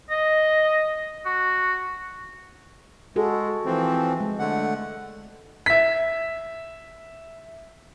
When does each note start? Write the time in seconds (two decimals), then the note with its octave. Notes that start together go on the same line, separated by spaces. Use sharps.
0.10 D#5
1.26 F#4
3.16 G#3 F#4 G#4 A4
3.65 E3 F3 C4
4.21 G#3
4.39 D3 A3 F#5
5.66 E5 B6